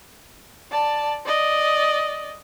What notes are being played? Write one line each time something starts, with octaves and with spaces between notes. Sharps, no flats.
D5 A5
D5 D#5